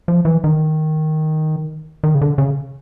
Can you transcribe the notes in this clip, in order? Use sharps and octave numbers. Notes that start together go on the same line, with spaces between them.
F3
E3
D#3
D#3
C#3
D3
C#3